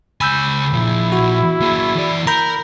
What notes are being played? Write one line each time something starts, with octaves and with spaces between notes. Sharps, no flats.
C#2 G#5 B5 E6 G6
A#2 F3 E4
F#4
A#3 G#4
E3 D5
A#4 A#5 B5 G6